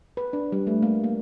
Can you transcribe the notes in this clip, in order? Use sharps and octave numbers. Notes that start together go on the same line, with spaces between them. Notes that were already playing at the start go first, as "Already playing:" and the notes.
B4
D4
G3
A3
A#3
A#3